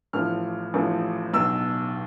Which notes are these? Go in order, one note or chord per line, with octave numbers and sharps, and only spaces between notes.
A1 A2 F3 F6
A1 A2 F3
B1 B2 E6